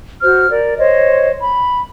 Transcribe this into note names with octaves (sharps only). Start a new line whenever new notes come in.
F#4 C5 F6
A#4 D5
C5 C#5 D#5
B5